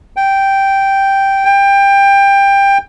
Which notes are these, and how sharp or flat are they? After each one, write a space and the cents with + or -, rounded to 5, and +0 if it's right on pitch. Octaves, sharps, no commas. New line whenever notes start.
G5 -5
G5 +20